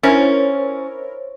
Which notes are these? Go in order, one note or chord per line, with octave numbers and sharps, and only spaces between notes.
C#4 E4 A#4 C5 C#5 A6